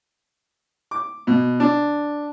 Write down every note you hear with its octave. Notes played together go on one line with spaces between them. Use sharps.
D6
B2
D4